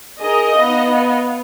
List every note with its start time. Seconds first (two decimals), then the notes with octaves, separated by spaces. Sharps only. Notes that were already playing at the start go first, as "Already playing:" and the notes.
0.21 D#4 G#4 A#4 D#5
0.57 B3 F5